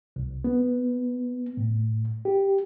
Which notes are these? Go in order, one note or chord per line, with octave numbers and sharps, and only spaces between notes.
C2
B3
A2
G4